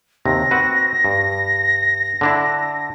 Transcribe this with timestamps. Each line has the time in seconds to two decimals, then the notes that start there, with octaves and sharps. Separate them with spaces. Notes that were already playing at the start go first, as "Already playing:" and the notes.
0.26 D#2 C3 A#6
0.51 C4 F#4 B4
1.05 G2
2.21 D3 D4 E4